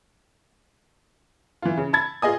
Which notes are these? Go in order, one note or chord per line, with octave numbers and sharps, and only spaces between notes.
E3 F4
C#3
A5 B5 G#6 A6
F4 G#4 D#5 G#5 D#6